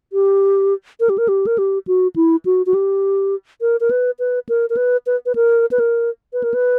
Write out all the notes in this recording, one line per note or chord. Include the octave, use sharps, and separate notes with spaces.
G4
A#4
G4
A#4
G4
A#4
G4
F#4
E4
F#4
F#4
G4
A#4
A#4
B4
B4
A#4
A#4
B4
B4
B4
A#4
B4
A#4
B4
A#4
B4